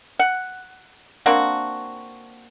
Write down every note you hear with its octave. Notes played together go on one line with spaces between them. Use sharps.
F#5
A#3 C4 D4 F#4